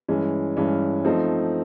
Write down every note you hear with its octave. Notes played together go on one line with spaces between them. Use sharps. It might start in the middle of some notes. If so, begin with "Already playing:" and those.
G2 E3 G#3 C#4
G2 E3 G#3 C#4
F3 A3 C4 D#4